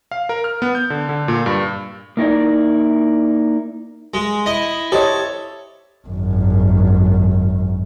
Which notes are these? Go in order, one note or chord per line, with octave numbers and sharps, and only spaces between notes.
F5
A#4
F6
B3
G6
D3
D3
A#2
G2
A#3 D#4 E4 D5
G#3
E4 D#5
G4 A4 C5 C#5 D#5
G#1 F#2